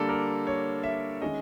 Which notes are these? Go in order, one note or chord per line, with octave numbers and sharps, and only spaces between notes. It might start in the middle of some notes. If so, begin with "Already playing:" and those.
Already playing: D3 G3 A#3 D4 A4
A#4
C#5
E5
D#3 G#3 C#4 D#5